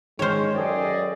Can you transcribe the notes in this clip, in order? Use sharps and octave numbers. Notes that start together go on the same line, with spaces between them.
D#3 G#3 C5 C#5 F6
F#2 G#4 A4 D5 D#5 G5